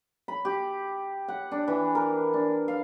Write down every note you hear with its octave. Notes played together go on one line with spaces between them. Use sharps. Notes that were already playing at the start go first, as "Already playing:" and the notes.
B5
G4
F#5
D4
E3
A#4
D4
F5